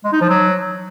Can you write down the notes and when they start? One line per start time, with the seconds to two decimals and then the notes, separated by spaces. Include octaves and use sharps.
0.05 G#3
0.13 D#4
0.21 F3
0.30 F#3